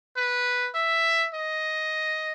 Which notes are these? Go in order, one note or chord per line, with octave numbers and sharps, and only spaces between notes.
B4
E5
D#5